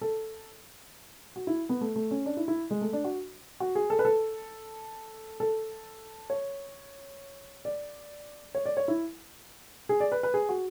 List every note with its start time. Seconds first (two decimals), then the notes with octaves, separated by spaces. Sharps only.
0.01 A4
1.36 F#4
1.47 E4
1.69 B3
1.81 A3
1.96 A3
2.11 C#4
2.26 D4
2.37 E4
2.48 E4
2.71 G#3
2.81 A3
2.93 D4
3.04 F#4
3.60 F#4
3.75 G#4
3.90 A4
3.99 B4
4.05 A4
5.40 A4
6.30 C#5
7.65 D5
8.55 C#5
8.66 D5
8.77 C#5
8.88 E4
9.89 G#4
10.00 D5
10.12 B4
10.23 B4
10.34 G#4
10.49 F#4